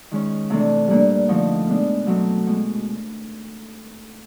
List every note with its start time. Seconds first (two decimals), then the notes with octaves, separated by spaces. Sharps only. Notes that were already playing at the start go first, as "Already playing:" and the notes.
0.11 D#3 G#3 C#4
0.50 C3 E3 A3 D4
0.88 A#2 G3 A#3 D4
1.28 D3 F3 A3 C4 D#4
1.67 B2 G#3 B3 D4
2.06 B2 F#3 A3 C4
2.47 B2 G#3